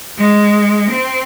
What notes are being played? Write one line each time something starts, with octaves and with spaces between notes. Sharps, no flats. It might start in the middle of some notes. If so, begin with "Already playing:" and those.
G#3
C4